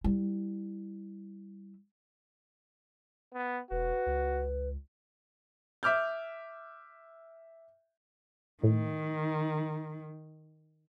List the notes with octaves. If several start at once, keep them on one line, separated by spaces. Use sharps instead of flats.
G3 E4
B3
E1 F#4 B4
C#2
E5 D6 F6 G6
A2 D#3